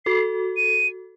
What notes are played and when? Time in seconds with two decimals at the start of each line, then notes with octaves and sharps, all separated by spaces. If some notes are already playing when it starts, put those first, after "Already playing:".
0.05 F#4 A4 C7
0.57 D#7